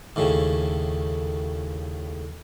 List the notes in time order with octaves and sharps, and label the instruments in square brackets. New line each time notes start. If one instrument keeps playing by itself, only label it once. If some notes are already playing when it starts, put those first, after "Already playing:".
[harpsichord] D#2 A2 C#3